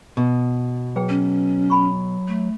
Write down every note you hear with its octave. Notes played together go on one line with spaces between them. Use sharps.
B2
F#3 G#4 B4 G5
C#4
G#5 B5 C#6
A3